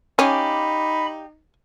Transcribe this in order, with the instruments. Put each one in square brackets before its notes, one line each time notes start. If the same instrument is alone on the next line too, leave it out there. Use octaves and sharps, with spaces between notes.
[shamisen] C#4 [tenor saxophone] D#4 [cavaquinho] G4 D5 F5 [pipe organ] B5